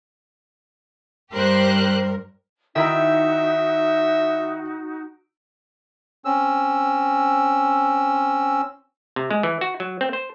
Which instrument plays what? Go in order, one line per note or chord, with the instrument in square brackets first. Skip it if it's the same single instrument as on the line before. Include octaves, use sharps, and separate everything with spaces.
[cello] G2 A#4 [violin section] G4 C5 F#6
[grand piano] D#3 E4 A#5 [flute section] D#4 F#4 [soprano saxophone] E5
[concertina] C4 C#4 E6
[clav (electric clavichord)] C3
G#3
E3
F#4
F#3
C4
C5